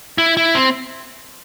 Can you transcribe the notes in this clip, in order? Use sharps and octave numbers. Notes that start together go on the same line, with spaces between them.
E4
E4
C4